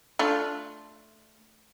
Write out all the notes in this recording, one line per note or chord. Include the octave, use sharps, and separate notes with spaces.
A3 D4 F4